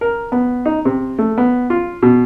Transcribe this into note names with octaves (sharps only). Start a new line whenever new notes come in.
A#4
B3
D#4
C3
A3
B3
F4
B2